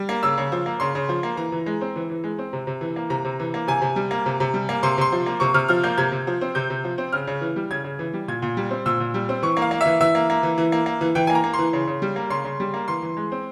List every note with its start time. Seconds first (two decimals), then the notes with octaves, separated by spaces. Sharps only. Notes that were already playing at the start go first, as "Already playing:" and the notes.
Already playing: G3
0.09 A#3
0.23 C#3 E6
0.38 C#3
0.52 F3
0.66 A#3
0.80 C#3 C6
0.95 C#3
1.09 F3
1.23 A#3
1.37 E3 A#5
1.52 E3
1.66 G#3
1.81 C4
1.96 E3
2.10 E3
2.24 G#3
2.39 C4
2.53 C3
2.67 C3
2.81 E3
2.96 A#3
3.10 C3 A#5
3.25 C3
3.40 E3
3.54 A#3
3.68 C3 G#5
3.82 C3
3.96 G3
4.11 A#3
4.26 C3
4.40 C3
4.54 G3
4.69 A#3
4.83 C3 C6
4.98 C3 C6
5.12 F3
5.26 A#3
5.40 C3 C#6
5.54 C3 F6
5.68 F3 F6
5.83 A#3 G6
5.98 C3 G#6
6.12 C3
6.27 F3
6.41 C4
6.55 C3 G6
6.70 C3
6.84 F3
6.98 C4
7.12 C#3 F6
7.27 C#3
7.41 E3
7.56 G3
7.71 C#3 G#6
7.84 C#3
7.99 E3
8.13 G3
8.28 A#2 G#6
8.42 A#2
8.57 G3
8.71 C4
8.86 A#2 E6
9.00 A#2
9.14 G3
9.29 C4
9.42 E3 C#6
9.57 A#3
9.62 F5
9.71 A#3
9.81 E5
9.86 E3
10.01 E3 E5
10.15 A#3
10.30 A#3
10.43 E3
10.58 E3
10.72 A#3
10.86 A#3
11.01 E3
11.15 E3 G5
11.27 G#5
11.30 A#3
11.35 A#5
11.44 A#3
11.54 C6
11.59 E3
11.73 C#3
11.87 C#3
12.02 G3
12.16 A#3
12.30 C#3 C6
12.45 C#3
12.60 G3
12.74 A#3
12.88 E3 C6
13.03 E3
13.17 G#3
13.32 C4